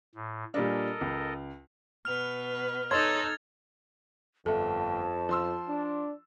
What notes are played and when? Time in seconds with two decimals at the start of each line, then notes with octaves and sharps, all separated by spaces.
0.15 A2
0.54 A#2 G3 D4 A4 A#4 D#5
1.01 C#2
2.05 B2 B4 F6 F7
2.91 D#4 A4 C#5 D#5 C6 G#6 A6 F7
4.46 G1 F2 A4 E5 A5
5.29 F3 C6 E6
5.68 D4